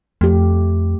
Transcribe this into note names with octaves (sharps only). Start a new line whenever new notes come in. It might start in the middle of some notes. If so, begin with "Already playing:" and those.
F2 A3 G4